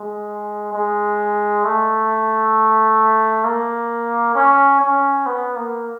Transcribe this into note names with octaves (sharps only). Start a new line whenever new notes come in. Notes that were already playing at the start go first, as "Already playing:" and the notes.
Already playing: G#3
G#3
A3
A#3
C#4
C#4
B3
A#3